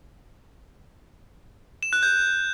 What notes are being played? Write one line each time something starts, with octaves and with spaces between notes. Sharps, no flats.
E7
F#6
G6